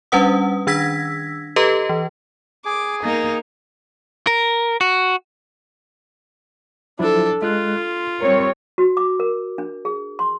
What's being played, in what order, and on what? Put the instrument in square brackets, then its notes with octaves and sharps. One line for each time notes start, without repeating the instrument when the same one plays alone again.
[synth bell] G3 C#4 D4 B4 F#5 D#6
D#3 D4 E6 G#6 A#6 B6
G4 A4 B4 D#5 A#5
E3
[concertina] G#4 G#5 [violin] D6
[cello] A#3 [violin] D#4
[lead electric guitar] A#4
F#4
[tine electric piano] F3 F#3 E4 [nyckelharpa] D4 A4
[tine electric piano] G#3 F#6 [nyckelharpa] F4
[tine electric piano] C6
[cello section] G3 C4 C#5 [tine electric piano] A#4
[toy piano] F#4
D6
A#4
D4
G#4
C6